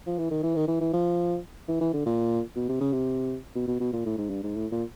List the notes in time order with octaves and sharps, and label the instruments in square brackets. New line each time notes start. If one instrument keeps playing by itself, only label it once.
[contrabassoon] F3
E3
D#3
E3
D#3
E3
E3
F3
E3
E3
D3
A#2
B2
C3
C#3
C3
B2
B2
B2
A#2
A2
G#2
G2
G#2
A2
A#2